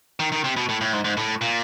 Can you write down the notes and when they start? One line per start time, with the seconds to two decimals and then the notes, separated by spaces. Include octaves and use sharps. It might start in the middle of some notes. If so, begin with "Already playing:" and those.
0.20 D#3
0.32 D#3
0.44 C3
0.57 B2
0.69 A2
0.81 A2
0.93 G#2
1.04 G#2
1.17 A2
1.41 A#2